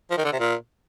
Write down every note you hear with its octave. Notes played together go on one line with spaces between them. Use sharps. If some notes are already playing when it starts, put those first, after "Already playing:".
F3
D#3
D3
C3
A#2